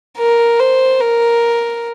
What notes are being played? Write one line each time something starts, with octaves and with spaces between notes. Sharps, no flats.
A#4
C5
A#4